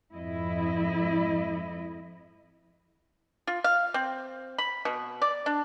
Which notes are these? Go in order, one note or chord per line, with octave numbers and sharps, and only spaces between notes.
F2 G#2 E4 D#5
F4
F5
C4
B5
B2
D5
D4